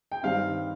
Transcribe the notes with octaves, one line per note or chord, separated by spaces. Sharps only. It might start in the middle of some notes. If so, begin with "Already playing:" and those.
G5
G2 D#3 G3 C4 F5